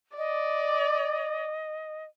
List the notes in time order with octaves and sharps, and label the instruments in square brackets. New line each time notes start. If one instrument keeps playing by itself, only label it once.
[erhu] D5 [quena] D#5